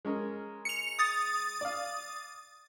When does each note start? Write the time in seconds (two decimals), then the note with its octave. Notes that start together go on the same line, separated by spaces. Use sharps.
0.05 G#3 C#4 A#4
0.65 C#7 F7
0.99 D#6 A6
1.61 D5 F5